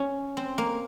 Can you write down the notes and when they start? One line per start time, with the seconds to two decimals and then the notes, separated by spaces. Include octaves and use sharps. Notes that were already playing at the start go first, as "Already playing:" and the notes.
Already playing: C#4
0.37 C4
0.58 A#3